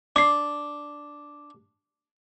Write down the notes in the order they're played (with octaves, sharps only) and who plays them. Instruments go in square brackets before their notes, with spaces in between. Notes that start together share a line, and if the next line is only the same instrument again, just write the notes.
[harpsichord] D4 [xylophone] D6 C7